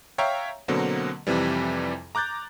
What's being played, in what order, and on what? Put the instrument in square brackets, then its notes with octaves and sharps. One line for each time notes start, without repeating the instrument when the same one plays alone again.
[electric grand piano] C#5 E5 F5 G5 A#5 C#6
B2 D3 F#3 A#3 C4
F2 C3 E3 G3
A#5 D6 F#6 G6 A6